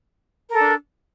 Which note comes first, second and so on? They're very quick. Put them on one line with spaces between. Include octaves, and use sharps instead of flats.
A#4 A4 D4